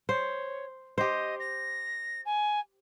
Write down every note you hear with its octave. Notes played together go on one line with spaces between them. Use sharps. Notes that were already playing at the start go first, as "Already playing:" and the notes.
C5 C#5
G4 C5 D#5
A#6
G#5